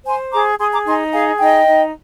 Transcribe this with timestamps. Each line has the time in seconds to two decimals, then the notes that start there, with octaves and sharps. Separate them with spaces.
0.05 C5 G#5 C6
0.32 G#4 A#5 D6
0.59 G#4 C6 D#6
0.72 A#5 D6
0.86 D#4 G#5 C6
1.13 G#4 F5 G#5
1.40 D#4 D#5 G5
1.67 D#4